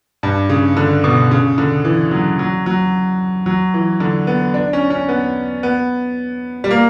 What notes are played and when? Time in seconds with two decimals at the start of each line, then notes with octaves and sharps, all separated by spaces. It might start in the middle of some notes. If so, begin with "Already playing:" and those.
0.23 G2
0.50 C#3
0.77 D3
1.04 B2
1.31 C#3
1.58 D3
1.85 E3
2.11 F#3
2.39 F#3
2.66 F#3
3.46 F#3
3.74 E3
4.00 D3
4.27 B3
4.54 D4
4.73 C#4
4.90 C#4
5.08 B3
5.63 B3
6.64 G3
6.71 A#3